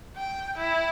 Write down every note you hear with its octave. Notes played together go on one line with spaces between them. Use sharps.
G5
E4